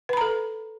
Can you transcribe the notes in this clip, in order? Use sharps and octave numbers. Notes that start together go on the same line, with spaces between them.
A4 B4 A#5 B5